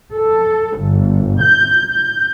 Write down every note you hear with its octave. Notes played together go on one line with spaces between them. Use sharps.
A4
G1
G6
G6